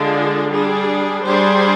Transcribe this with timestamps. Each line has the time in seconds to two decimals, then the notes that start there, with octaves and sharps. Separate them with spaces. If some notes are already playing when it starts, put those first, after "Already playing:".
Already playing: D3 G#3 D4 F4 G#4
0.51 G3 D4 G#4
1.25 G3 D4 G#4 C5